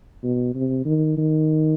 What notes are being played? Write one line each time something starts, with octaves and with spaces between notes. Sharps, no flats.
B2
C3
D#3
D#3